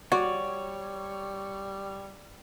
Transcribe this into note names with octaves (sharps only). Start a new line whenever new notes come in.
G3 F#4 C#5 D5